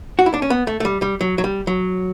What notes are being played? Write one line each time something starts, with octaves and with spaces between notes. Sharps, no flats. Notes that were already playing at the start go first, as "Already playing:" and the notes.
F#4
E4
D4
C#4
B3
A3
A3
G3
G3
F#3
F#3
G3
F#3